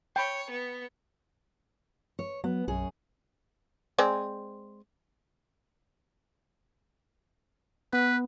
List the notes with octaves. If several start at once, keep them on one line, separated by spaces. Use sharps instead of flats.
C#5 G5 B5
B3
C#5
F#3 B3
B1 F#2 G#4 C#5
G#3 C4 D5
B3 B4